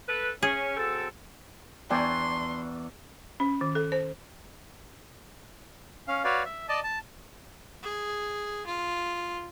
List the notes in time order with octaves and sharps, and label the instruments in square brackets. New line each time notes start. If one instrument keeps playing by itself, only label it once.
[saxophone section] A4 B4
[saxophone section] C#4 [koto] G#4
[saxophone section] F#3 C4 A4
[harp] E2 A#5 [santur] D4 C#6 [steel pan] D5 G5 G#5 [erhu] C6
[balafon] C#4
D#3
A4
C5
[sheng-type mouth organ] C#4 F5
F#4 B4 C#5 D5 F5
E5
D5 D#5 A5
A5
[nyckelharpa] G#4
F4